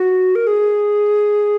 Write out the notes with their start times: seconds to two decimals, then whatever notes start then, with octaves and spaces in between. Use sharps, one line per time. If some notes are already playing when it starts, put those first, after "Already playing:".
Already playing: F#4
0.35 A#4
0.47 G#4